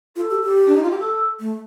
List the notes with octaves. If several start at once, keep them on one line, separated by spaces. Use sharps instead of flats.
F4 A4
G4
G4
D4
D#4
F4
G4
A4
A3